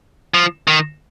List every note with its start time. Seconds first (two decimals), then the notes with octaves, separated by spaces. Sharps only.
0.34 F3
0.68 D#3